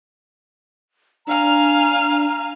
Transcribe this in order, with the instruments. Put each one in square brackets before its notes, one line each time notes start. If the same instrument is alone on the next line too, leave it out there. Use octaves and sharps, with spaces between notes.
[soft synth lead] D4 [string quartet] F5 G#5 F6 [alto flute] A#5